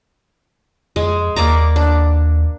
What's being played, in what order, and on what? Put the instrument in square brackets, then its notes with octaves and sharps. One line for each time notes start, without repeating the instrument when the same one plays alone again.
[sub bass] F2 [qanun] G#3
[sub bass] D#2 [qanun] A#3 D5 A#5
[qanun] D4